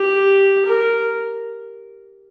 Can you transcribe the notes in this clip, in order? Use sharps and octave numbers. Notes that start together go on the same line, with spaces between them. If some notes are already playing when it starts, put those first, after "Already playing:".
Already playing: G4
A#4